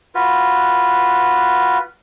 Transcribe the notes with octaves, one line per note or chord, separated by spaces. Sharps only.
F4 F#4 B4